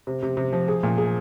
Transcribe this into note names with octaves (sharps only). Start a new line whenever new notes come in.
C3
C3
C3
F3
G#4
A#2
G#4